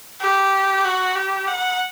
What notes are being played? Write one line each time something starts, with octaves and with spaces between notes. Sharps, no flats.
G4
F#4
G4
F#5